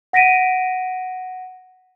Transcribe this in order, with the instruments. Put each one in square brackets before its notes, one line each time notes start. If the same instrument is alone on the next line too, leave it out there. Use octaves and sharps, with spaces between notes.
[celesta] F#5 A#6 B6 D7 D#7